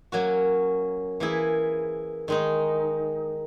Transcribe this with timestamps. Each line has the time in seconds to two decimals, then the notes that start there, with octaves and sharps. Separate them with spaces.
0.12 F#3 A#3 C#4 F#4
1.20 E3 A#3 E4 G#4
2.28 D#3 G#3 D#4